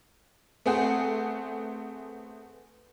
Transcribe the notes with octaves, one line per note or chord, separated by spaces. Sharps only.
A3 B3 C4 G#4 F#5